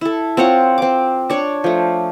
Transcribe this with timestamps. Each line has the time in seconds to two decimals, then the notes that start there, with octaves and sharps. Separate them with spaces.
0.01 E4 A4
0.37 C4 F4 C#5 F#5
0.78 C4 D6
1.30 D4 C#5
1.64 F3 A3